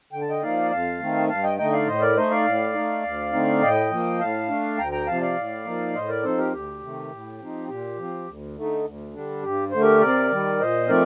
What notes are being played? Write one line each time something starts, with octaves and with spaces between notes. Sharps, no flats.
D3 G5
A5
D#5 G5
F3 A#3 D#4 D5 F5
F2 F5 A5
D#3 A3 C4 D#4
G2 F5 A5
D#5 G5
D3 A3 D#4 D#5 G5
D5 F5
A2 C5 D#5
A#4 D5
A3 D#4 C5 D#5
D5 F5
A2
A3 D#4
D2
D3 A3 C4 D#4
A2 D#5 G5
F3 A#3
A2 F5 A5
A3 D4
D2 G5 A#5
G5 A#5
C3 F3 F5 A5
D5 F5
A2
F3 A#3 D#4
A2 C5 D#5
A#4 D5
F3 C4 D#4 A4 C5
G4 A#4
D2 G4
C3 D#3 A3
A2
F3 C4 D#4
A#2 G4
F3 C4
D2
D3 A3 D#4
D2
D3 G3 D4
G2 G4
D3 A3 C5
G4 A#4
C3 A#4 D5
D#3 G3
A#2 C5 D#5
F3 A3 C4 D#4 A#4 D5